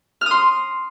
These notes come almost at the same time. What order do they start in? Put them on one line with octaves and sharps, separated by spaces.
F6 D#6 C6